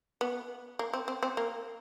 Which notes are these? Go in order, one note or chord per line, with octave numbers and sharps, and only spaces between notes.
B3
A#3
C4
C4
C4
A#3